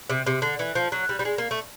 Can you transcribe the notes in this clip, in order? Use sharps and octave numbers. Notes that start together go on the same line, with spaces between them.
C3
C3
D3
E3
F3
F#3
G3
G3
G#3
A#3
A3